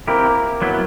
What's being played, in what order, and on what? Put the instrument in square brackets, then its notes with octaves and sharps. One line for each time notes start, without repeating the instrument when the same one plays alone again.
[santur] A#3 [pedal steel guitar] C4 E4 G4
[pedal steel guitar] F#3 B3 E4